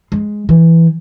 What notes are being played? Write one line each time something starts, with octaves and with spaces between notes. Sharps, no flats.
G#3
E3